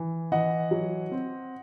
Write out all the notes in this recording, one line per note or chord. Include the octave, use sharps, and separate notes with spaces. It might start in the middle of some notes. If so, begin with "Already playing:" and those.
Already playing: E3
E3 D#5 F#5
F#3
C4